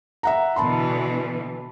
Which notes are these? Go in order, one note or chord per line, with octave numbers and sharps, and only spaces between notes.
E5 F#5 A#5
B2 D3 E3 A5 B5 C6